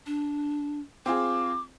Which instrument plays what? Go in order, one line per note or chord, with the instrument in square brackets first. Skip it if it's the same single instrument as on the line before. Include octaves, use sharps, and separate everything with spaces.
[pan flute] D4
[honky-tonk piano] C4 F4 G#4 [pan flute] D6